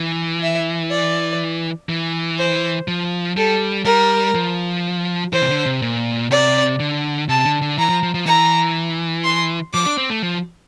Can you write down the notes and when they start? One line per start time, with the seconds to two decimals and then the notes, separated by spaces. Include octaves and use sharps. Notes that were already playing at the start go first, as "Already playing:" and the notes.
Already playing: E3
0.43 E5
0.91 D5
1.89 E3
2.38 C5
2.88 F3
3.37 G3 A4
3.85 G3 A#4
4.35 F3
5.32 E3 C5
5.41 C3
5.49 D3
5.66 C3
5.82 A#2
6.31 C3 D5
6.80 D3
7.29 C3 A5
7.45 D3
7.61 D3
7.78 E3 A#5
7.89 F3
8.03 F3
8.14 F3
8.26 E3 A#5
9.24 C6
9.73 F3 D6
9.86 D4
9.98 C4
10.10 A3
10.23 F3